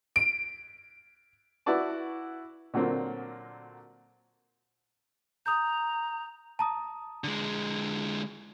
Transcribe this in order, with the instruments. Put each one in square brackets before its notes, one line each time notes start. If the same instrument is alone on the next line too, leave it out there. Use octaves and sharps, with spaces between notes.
[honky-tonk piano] D7
[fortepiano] E4 F#4 B4 D5 A5
A#2 D3 F#3 A#3 C4
[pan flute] A#5 [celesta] D#6 G6
[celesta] A5 A#5 D#6
[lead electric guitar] D3 G#3